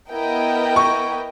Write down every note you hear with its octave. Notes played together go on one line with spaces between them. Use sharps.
B3 E4 A#4 D#5 G5
C#6